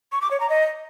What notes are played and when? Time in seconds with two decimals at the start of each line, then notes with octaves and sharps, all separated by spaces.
0.12 C#6
0.21 D6
0.31 C#5
0.40 A#5
0.50 D#5